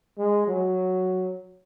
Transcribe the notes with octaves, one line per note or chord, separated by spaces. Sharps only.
G#3
F#3